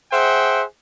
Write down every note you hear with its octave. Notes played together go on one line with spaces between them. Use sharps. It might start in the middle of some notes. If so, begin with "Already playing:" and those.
G#4 C5 E5 F#5 G5